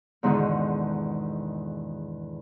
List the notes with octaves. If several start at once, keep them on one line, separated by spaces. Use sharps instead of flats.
E2 G#2 B2 D3 D#3